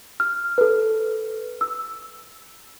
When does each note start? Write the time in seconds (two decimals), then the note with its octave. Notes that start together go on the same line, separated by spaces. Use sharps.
0.20 F6
0.58 A4 B4
1.61 E6